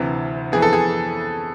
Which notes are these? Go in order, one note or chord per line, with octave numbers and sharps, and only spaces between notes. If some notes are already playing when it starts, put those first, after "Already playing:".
Already playing: D2 C3 E3
F2 E3 B3 G#4
A4
G#4